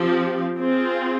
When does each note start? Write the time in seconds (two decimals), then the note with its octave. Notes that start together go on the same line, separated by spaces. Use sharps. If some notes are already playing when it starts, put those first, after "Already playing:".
Already playing: F3 C4 G4
0.58 C4 F4 G#4